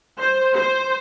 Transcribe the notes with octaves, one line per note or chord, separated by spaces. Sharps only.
C5
C5